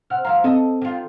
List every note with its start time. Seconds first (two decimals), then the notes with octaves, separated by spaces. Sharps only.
0.10 C3 F#5 F6
0.25 D#2 F3 F5 A#5
0.44 C4 A4 D#5
0.82 D#3 F4